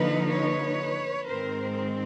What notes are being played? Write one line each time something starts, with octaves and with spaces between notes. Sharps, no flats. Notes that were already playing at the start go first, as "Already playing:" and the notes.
Already playing: D3 F3 A#3 D#4 B4
B4 C#5
G#2 D#3 G#3 C4 A#4 C5